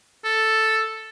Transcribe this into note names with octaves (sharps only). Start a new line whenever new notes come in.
A4